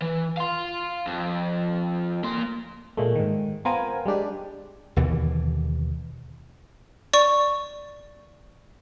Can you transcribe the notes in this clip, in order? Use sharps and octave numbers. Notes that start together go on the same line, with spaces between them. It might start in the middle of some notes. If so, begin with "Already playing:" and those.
E3
F5 C6
F2
A#3 C6
A#2 G#3 A3
G#2 D#3
B3 C4 F4 A#4 C5 G#5
G3 G#3 D4 G4
D#2 B2 D3 E3
D5 C#6